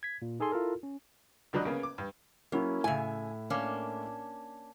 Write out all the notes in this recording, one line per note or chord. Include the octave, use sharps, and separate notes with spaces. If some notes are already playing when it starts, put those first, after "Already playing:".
G#6 B6
A#2
D#4 G#4 A4 G#5 C6
E4 F4 A4 A#4
C#4
C#2 D3 F#3 G3 D#5
C#3 A#3 B3 C#4
D6
G2
F#3 A#3 C#4 E4
A2 C#3 E5 G#5
A#3 C#4 D4